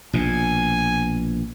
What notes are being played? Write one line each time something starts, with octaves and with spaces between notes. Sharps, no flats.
A#1 B2 G#5